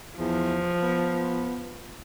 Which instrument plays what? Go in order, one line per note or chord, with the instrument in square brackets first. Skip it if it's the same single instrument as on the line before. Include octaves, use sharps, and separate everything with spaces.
[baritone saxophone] E2 [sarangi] F3
[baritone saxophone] B3